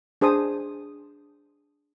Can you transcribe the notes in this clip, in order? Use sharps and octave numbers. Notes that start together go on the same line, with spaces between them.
D4 G#4 C5 A5 D#6